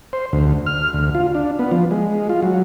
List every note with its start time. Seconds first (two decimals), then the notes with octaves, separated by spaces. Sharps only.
0.13 C5
0.33 D2
0.66 F6
0.93 D2
1.15 F4
1.35 D4
1.59 B3
1.72 F3
1.91 G#3
2.29 F4
2.42 F#3